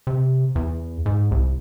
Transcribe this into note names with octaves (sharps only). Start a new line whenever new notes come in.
C3
E2
G#2
C2